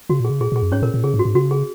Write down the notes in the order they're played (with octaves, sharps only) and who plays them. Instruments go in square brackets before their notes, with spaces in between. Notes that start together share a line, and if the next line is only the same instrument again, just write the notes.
[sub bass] C#3 [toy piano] F#4
[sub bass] A#2
[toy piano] G#4
[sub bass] C#3
[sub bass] A#2 [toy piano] G#4
[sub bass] A#2 [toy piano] G#4
[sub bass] F#2
[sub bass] G#2 [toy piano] C#4 C#5
[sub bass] A#2 [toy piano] A#4
[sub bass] A#2
[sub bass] C#3 [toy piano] G#4
[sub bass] G#2
[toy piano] F#4
[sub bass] G#2
[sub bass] C#3 [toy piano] F#4
[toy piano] G#4